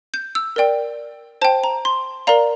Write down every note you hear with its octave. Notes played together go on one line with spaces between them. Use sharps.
G6
E6
A#4 D5 G5
C5 G5 A5
A#5
C6
A#4 D5 F5 A#5